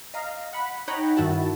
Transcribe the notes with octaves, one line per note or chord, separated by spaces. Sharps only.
D#5 F5 A#5
F#5 B5
D#4 C#5 F#5 G5 A#5 B5
G2 D#3 E4 F#4 A5